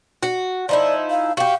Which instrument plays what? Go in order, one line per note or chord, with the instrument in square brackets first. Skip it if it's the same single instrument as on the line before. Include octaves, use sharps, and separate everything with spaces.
[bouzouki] F#4
[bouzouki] F3 D#4 E4 [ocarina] D5
[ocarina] F5
[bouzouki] F#4 G4 [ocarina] F5